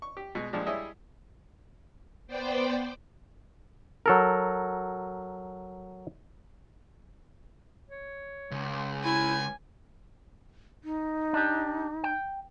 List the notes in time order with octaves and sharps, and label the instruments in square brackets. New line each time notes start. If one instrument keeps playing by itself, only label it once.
[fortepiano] C#6
G4
B2 G#3
A#2 F3 G3 G#3 D4
G3 E4 G#4 C#5 D#5 E5
[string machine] B3 C5 D5 G5
[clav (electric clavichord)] F#3 A4 A#4
[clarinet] C#5
[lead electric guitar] C#2
[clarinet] E4 [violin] G#5
[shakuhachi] D#4
[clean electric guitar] D4 G4
G5